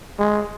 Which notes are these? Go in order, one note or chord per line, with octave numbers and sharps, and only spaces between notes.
G#3